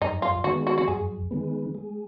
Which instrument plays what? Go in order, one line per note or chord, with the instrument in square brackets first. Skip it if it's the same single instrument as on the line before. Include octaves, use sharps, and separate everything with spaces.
[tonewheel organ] F#2 [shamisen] D#4
[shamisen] F4
[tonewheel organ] D#3 G#3 B3 [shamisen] F#4
[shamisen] F#4
F#4
[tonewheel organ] F#2 [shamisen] G#4
[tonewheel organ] D#3 G#3 B3
G#3